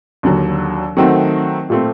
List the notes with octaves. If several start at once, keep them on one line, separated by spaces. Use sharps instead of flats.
D#2 D3 F#3
D#3 F#3 A3 C4 F#4
A#2 A3 C4